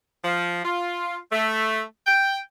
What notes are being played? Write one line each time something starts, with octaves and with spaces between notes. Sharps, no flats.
F3
F4
A3
G5